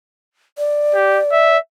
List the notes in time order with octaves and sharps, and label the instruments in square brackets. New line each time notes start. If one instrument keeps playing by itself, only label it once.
[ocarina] D5
[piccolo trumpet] G4
E5